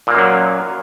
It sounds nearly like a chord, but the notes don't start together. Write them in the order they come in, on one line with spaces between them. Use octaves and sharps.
A#2 A#3 F#2 F#3